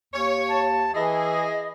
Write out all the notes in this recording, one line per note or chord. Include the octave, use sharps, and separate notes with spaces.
D#2 C#5
A5
E3 E4 G#4 D#5